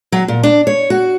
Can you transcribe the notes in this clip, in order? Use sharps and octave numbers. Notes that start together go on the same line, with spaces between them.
F#3
A#2
D4
C#5
F#4